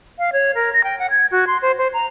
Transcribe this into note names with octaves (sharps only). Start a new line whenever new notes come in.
F5
C#5
A#4
A#6
G5
F#5
G#6
F#4
C6
C5
C5
A#5